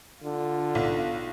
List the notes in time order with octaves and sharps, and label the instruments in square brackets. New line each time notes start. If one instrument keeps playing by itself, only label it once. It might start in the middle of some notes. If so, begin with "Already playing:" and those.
[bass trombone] D3 [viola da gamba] F4
[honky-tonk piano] B1